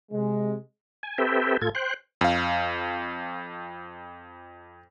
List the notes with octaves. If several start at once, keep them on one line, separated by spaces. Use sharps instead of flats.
C3 G#3
G#5
C4 G4 A4 B4 E5 G5
A2 F4 A4 G#6
C5 G5 F#6
F2 F5